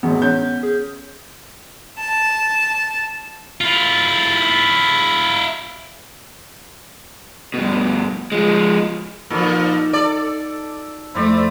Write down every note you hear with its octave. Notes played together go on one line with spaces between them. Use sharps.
E1 A1 B3
C#4 G6
G#4
A5
E4 F4
G2 B2
F3 G#3
A#2 F3 D#4 F4 F#4 A4 A#4 D6
A4 D5
F2 A3 E4 C5 D5